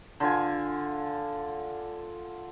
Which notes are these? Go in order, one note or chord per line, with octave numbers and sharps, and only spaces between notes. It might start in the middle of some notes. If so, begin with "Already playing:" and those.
D3 F4 G#5